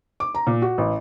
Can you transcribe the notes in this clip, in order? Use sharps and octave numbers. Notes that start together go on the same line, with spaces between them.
D6
A#5
A#2
F#4
A1